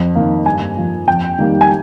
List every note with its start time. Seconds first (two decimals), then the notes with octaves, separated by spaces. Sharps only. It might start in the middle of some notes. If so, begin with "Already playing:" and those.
Already playing: F2
0.15 D#3 A#3
0.46 G2 G#5
0.77 F3 A#3
1.08 F2 G5
1.39 D#3 G3 A#3
1.61 G#5